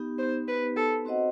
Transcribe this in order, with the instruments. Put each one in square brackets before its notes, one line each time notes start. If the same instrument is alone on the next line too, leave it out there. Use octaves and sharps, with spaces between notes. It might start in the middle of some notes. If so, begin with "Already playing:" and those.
Already playing: [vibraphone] B3 D#4 G4
[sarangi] C5
B4
A4
[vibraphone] C4 F#4 C5 D#5 F#5